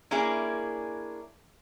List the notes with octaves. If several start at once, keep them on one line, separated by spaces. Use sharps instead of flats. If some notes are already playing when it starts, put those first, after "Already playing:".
A#3 C#4 D4 E4 G#4